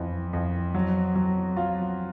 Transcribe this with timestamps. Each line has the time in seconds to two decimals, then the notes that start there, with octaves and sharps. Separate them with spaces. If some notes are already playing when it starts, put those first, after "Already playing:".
Already playing: F2 E3
0.33 F2
0.74 F#3
1.15 F#3
1.57 F#3 F4